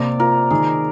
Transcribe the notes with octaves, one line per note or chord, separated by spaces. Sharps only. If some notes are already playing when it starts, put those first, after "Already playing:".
Already playing: C3 A#3 C5 D5
F4 A#4
D#3 G#4